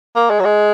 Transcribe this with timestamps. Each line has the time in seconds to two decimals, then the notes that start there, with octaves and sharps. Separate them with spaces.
0.16 A#3
0.30 G#3
0.40 F#3
0.45 G#3